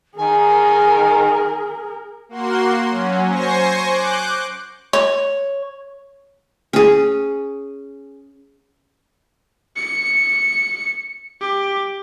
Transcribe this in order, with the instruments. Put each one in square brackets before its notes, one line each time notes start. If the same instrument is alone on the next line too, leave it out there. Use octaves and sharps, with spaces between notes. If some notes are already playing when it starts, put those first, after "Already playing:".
[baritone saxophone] D#3 [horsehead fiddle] G#4 A#4 [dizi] G#5
[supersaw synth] A#3 F#4 C6
F#3 C#4
C5 G#5 C#6 A#6 C7
D6 F#6 G6
[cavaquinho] C#5
[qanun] C#4 G#4
[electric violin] C#7
G4